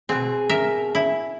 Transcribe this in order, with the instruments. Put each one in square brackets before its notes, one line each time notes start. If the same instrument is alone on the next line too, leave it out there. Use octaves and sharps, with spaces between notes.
[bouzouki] B2 G#4 [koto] C4
[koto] A#4 E5
E4